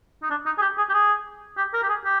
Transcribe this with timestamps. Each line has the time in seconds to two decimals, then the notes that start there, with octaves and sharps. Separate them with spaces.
0.22 D#4
0.30 D4
0.46 D#4
0.58 G#4
0.61 G4
0.78 G#4
0.89 G4
0.93 G#4
1.57 G4
1.73 A#4
1.83 G4
1.89 G#4
2.05 G4